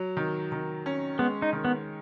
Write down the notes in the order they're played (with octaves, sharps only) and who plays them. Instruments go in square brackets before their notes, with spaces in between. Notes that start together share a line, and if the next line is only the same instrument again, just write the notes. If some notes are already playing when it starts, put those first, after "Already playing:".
Already playing: [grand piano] F#3
D#3
D#3
C#4
[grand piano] G#3 [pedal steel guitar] B3
[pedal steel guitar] D#4
[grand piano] D#3
[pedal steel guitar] B3